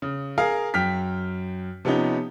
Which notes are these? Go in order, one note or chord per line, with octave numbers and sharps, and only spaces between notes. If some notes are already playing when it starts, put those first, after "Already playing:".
C#3
G#4 A#4 F5
F#2 G5 F6 B6
C3 F3 B3 C#4 D#4